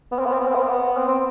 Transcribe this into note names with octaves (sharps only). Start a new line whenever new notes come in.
B3
C4
B3
C4
B3
C4
B3
C4
B3
C4
C4